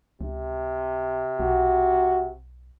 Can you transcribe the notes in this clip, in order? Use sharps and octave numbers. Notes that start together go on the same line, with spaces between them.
C#2 C3
B1 F#4